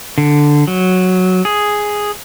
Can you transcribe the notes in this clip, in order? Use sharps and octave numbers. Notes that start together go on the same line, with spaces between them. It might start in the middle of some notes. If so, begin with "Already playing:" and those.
D3
F#3
G#4